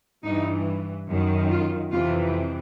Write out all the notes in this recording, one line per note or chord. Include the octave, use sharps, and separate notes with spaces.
G2 E3 D#4
F#2 D#3
F4
F2 C3 E3 F4